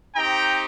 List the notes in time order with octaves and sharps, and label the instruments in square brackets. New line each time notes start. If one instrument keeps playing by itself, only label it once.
[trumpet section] C4 D#4 G4 G5 A#5